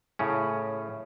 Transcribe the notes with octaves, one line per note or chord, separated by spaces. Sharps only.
A2 C#3 C#4